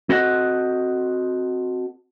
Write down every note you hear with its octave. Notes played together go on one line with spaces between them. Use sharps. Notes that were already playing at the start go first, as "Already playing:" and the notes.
C4 F#4 A4 C5 D#5 F#5